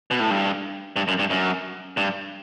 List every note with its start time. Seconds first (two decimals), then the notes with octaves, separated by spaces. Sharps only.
0.11 B2
0.20 A2
0.31 G2
0.96 G2
1.08 F#2
1.19 G2
1.30 F#2
1.97 G2